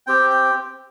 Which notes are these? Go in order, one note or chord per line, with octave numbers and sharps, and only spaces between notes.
C4 G4 G5
G5